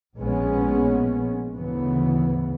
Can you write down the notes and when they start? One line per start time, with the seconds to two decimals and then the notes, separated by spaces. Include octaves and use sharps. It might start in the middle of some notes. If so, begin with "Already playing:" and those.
0.17 A#1 A#2 G#3 B3 C#4
1.54 D2 G#2 C#3 E3 B3